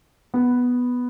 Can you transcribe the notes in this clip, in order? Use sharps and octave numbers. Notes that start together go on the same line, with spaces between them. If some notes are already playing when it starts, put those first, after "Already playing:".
B3